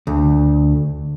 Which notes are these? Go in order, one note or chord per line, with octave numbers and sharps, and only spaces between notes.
D2